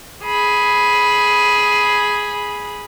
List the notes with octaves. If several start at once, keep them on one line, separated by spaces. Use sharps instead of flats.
G#4 B5